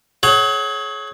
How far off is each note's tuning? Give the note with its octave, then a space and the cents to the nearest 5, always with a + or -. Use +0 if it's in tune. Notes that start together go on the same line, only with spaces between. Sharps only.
G#4 +40 C#5 -5 F#5 +20